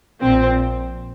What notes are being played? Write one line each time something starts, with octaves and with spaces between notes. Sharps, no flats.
A#1 A#2 F3 C4